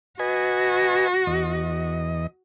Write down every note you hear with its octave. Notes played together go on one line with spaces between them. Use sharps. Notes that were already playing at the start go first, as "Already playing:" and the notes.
F#4 B4 D#5 G#5
E2 D#5